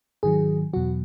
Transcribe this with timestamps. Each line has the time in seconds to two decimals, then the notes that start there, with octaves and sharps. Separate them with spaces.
0.23 G#2 D#3 F#3 G#4
0.73 E2 B2 F#3 F#4